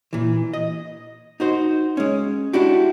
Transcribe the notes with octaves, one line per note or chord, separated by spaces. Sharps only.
A#2 E3
D#5
D#4 F#4 C5
G#3 C#4
D4 E4 F#4 G4